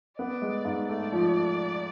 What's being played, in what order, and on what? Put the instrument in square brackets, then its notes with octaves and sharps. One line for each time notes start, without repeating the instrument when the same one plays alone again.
[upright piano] B3 [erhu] D5
[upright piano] G#3
G#2
[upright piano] A3 [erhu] D5
[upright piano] F3